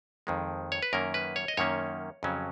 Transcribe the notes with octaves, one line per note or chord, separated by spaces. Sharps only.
F2 D#3 G#3
C#5
B4
F#2 D#3 A#3 C#4 A#4
B4
C#5
D#5
F#2 D#3 A#3 C#4 C#5
F2 C#3 F#3 C#4